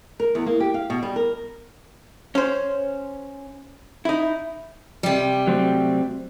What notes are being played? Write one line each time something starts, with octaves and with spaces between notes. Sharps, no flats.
A#4
E2
A#3
G4
F5
B2
G3
A#4
C#4 C5
D#4 E4
C3 G3
F#3 A3 C4